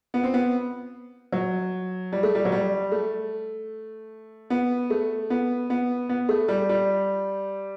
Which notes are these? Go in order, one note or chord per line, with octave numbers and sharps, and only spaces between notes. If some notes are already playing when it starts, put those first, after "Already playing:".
B3
C4
B3
F#3
G3
A3
G3
F#3
G3
A3
B3
A3
B3
B3
B3
A3
G3
G3